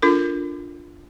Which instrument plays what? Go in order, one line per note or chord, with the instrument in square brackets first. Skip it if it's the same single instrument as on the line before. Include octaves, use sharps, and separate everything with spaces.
[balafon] D4 F4 A4 A#4